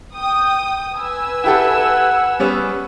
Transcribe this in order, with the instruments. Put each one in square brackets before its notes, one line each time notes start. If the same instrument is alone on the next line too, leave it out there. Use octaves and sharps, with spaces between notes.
[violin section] G5 D#6
B4 G#5 E6
[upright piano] E4 G4 A4 [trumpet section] F#5
[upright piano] G3 B3 C#4